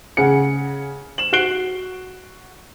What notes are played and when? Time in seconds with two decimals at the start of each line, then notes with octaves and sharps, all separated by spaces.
0.17 C#3 F#5 G#5 C#7
1.18 E7 F#7
1.33 F#4 F#6 C7 D7 G7